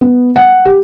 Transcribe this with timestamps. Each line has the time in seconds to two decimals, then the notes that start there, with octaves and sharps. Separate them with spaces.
0.01 B3
0.36 F#5
0.65 G4